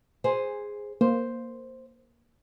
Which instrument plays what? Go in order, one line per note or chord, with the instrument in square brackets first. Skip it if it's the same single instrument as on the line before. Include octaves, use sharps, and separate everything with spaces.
[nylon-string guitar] G#4 C5
[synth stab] A#3 [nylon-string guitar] C5